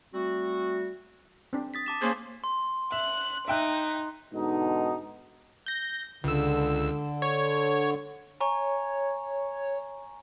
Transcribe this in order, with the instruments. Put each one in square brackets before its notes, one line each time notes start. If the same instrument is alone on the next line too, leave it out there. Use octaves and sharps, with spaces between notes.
[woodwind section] G3 A3 C4 F#4
[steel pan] C4 D4
[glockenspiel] D#6 A6 B6
A5 D6 E7
[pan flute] A#3 [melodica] C#4 G#4 C5
[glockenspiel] C6
[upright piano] E5 [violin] F#6
[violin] D#4 [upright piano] E5 G5 F#6
[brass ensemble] G#2 B2 D3 D#4
[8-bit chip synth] G6 A#6
[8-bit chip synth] C#2 E6 [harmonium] D3
[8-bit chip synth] C#5
[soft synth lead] C#5 [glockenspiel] G#5 A#5 C#6